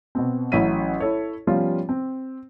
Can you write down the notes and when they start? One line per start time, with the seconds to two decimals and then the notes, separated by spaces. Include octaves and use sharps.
0.15 B2 B3 C4
0.52 A1 F#3 C#4 E4 B6 D#7
1.00 E4 A4 C#5
1.47 F3 G3 B3 C#4 F4
1.89 C4